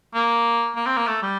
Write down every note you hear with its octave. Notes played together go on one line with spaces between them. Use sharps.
A#3
A#3
C4
A#3
A3
G3